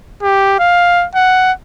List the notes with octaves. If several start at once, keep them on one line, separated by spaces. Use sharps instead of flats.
G4
F5
F#5